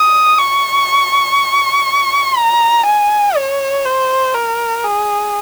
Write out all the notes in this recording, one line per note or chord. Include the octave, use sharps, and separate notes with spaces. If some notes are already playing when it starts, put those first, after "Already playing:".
Already playing: D#6
C#6
A#5
G#5
C#5
C5
A#4
G#4